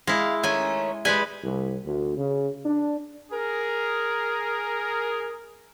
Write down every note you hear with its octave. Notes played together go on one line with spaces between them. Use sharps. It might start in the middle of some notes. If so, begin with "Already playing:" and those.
G#3 E4 F5
D#3 A3 C#4 G#5
G3 G#3 B4 G#5
C2
D2
C#3
D4
G#4 A#4